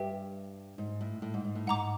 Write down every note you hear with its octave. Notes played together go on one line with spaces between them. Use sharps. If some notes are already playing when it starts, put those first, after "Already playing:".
Already playing: G2 G4 B4 E5 G5
G#2
A2
A2
G#2
G#2
A2
G#2 F#5 A#5 D6